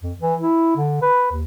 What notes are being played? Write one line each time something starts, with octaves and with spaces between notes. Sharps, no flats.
F2
E3
E4
D3
B4
D#2